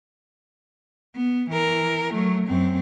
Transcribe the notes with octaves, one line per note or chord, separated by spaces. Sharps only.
B3
E3 A#4
F#3 A3
F#2 C4